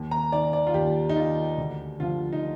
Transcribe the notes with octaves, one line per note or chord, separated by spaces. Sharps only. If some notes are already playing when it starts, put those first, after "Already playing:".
Already playing: D#2
A#5
D#3 D5
D5
F4
D#2 G4
D#4
D#3 F4
D2
D3 F3 F4
D#4